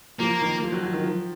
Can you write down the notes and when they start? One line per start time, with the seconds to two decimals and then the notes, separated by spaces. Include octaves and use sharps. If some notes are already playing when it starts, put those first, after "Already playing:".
0.20 F3 A#3
0.41 D#3
0.62 F3
0.72 F#3
0.83 F#3
0.93 D#3
1.03 F3